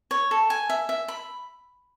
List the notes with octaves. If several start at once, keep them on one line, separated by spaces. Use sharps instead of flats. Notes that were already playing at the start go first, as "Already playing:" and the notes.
C#5
A4
G#5
E5
E5
B5